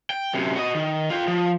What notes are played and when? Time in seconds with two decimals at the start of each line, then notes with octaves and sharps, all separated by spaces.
0.10 G5
0.34 F#2 C3
0.56 F#4 D#5
0.75 D#3
1.11 F4 G5
1.28 F3